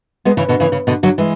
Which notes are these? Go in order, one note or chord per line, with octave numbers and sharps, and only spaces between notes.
G#3 B3
C#3 E3
B2 D3
C#3 E3
C#3
B2 D3
D3 F#3
E3 G#3